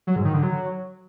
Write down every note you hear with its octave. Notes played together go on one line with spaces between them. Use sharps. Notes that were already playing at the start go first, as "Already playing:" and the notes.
F#3
G#2
D#3
D3
F#3